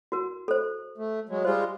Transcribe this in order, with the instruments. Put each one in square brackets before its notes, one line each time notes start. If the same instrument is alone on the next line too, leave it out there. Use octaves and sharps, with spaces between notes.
[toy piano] F#4 A#4
A4 C5
[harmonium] A3
F#3 G#3
[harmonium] G3 G#3 F4 [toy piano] C5